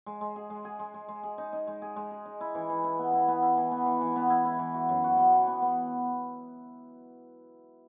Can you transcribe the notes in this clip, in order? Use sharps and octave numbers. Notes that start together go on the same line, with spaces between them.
G#3
G#3
G#4
G#3
G#4
G#3
G#3
G#3
G#4
D#4
D#4
G#3
G#4
G#3
G#4
D#4
E4
E3
E3
E4
B3
E4
B3
E4
E3
B3
E3
E3
B3
E4
E4
E3
F#4
F#2
F#4
B3
E3
B3
B3